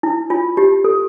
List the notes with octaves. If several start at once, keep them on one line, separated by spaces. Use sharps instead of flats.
E4
F4
G4
A4